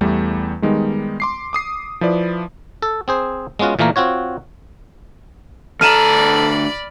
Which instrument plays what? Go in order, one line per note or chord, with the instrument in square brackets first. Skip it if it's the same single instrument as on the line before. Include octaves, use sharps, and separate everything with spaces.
[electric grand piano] E2 G3 A3
D#3 G3 G#3 B3 D#4
C6 D6 C7
D6 D#6 C7
F3 E4 B4 D5
[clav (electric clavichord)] A4
C4 G#4 C5
G#3 B3 C#4 F4 F#4
A#2 E3 A3 A#3 A#4
C4 F4 F#4 C#5
[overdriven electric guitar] D2 A#5 [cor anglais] A4 [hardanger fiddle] D5 B5 [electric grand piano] F6 D#7 E7